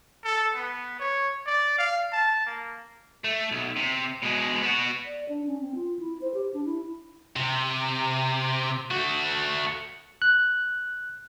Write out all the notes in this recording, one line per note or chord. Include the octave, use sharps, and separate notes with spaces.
A4
B3
C#5
D5
F5
A5
A#3
A3
B1
C3
B2 G#3
B3 F#4
D5
D4
C#4
C4
F4
E4
C5
G4
D4
E4
C3
A3 F#4
F#6